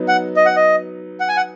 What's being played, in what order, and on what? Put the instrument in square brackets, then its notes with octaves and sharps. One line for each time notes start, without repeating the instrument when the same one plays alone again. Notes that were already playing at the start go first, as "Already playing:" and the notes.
Already playing: [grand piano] F#3 B3 D#4
[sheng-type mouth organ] F#5
D#5
F#5
D#5
F#5
G#5
F#5